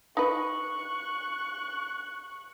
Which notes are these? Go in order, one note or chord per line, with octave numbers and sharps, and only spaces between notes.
D#4 E4 B4 C#6 F#6